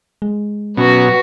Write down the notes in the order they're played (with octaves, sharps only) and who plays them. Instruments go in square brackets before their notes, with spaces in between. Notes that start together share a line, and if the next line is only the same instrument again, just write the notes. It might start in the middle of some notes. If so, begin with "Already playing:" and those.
[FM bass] G#3
[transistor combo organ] B2 F#3 [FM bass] C#4 [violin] F#4 B4